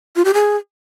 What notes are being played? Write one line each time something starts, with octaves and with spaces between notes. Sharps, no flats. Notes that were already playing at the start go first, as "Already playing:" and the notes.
F4
G4
G#4